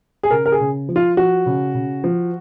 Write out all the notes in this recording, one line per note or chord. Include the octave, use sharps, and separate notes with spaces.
G#4
C#3 A#4
A#4
G#4
C#3
F3
F4
F3 F#4
C#3
C#3
F3